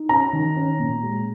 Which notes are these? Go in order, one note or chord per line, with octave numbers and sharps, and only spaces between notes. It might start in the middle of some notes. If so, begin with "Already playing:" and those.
Already playing: D#4
C#4 A#5
D#3
C#4
A#2
G#3